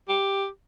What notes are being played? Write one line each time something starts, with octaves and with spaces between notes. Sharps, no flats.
G4